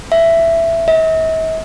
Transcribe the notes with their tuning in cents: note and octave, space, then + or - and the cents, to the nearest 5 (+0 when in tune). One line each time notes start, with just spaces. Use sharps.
E5 +10
E5 -45